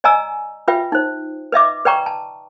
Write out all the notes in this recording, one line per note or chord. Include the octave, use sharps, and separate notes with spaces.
D5 D#5 G#5 A#5 E6
F4 B4 E5 G5
D#4 C5
B4 D#5 E5 D6
B4 D5 G5 A#5 C#6
A5